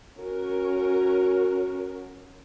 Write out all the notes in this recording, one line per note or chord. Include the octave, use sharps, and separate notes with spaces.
C#4 F#4 A#4